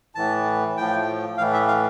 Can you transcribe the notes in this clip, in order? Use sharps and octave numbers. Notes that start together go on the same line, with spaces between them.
A2 E3 A5
A2 F3 G5
A2 E3 F5
E5
F5